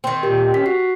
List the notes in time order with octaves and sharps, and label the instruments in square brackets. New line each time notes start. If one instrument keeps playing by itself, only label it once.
[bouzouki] D#3 C4
[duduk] A#2 [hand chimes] G4 A#4
[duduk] C#4 [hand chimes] B6
[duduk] F#4 [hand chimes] C7